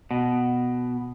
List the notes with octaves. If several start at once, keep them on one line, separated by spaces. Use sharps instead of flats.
B2